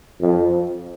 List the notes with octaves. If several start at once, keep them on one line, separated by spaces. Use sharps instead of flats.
F2